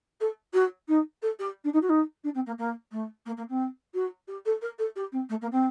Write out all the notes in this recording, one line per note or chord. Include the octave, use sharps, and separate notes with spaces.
A4
F#4
D#4
A4
G4
D4
D#4
F#4
D#4
D4
C4
A#3
A#3
A3
A#3
A#3
C4
F#4
G4
A4
A#4
A4
G4
C4
A3
A#3
C4